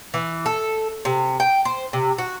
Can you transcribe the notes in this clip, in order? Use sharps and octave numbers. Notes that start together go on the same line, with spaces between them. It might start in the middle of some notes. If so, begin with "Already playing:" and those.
E3
A4
C3
G5
C5
C3
F#4